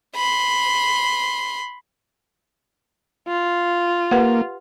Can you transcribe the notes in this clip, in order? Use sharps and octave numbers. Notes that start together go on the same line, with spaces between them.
B5 C6
F4
A#3 G4 B4 F#5